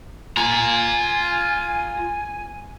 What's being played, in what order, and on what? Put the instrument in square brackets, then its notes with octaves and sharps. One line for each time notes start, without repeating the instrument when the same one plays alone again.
[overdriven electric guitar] F4 A#5 [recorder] G#5